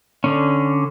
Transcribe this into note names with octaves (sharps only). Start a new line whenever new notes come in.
D3 C#4